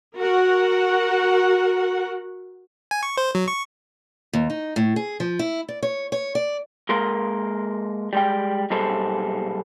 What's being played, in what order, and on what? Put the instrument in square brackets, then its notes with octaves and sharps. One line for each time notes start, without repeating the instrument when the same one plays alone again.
[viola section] F#4 A#4 F#5
[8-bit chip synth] G#5
C#6
C5
F#3
C#6
[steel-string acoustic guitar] D#2
D#4
A2
G#4
F3
E4
D5
C#5
C#5
D5
[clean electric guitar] G#3 A#3 A#4 C6
G3 G#3 G5
B1 A#2 G3 G#4 A4 C5